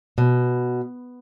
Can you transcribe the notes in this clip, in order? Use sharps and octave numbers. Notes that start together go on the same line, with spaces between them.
B2